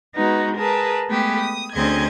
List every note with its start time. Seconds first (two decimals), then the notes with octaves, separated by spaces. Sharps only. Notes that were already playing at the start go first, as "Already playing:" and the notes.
0.15 G#3 B3 D#4 F#4 B4
0.57 G#4 A#4 B4 A5
1.09 G#3 A3 B3 G4 G#4
1.40 D#6
1.74 D2 C4 C#4 G#4 D#5 G#6